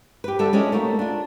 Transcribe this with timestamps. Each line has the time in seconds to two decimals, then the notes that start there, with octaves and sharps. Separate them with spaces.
0.24 G4 B4
0.39 D3 G3 G4 A4 E5
0.53 G#3 C#4 D4 E4 F4
0.72 A3 A#3 D#4 F#4
0.99 D4 F4